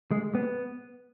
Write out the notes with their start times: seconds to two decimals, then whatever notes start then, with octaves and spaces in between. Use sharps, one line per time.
0.11 G#3
0.35 B3